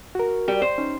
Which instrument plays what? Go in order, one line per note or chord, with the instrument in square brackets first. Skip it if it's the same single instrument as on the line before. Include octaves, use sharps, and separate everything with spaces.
[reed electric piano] F#4 A#4
[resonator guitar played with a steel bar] G3 G4
C5
[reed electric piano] C#4 D#4